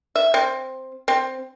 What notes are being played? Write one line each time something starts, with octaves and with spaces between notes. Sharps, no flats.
E5
C4
C4